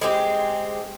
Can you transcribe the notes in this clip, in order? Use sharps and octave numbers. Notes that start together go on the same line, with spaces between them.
G#3 C4 G4